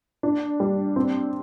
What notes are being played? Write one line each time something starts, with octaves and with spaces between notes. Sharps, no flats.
D4
G3
C4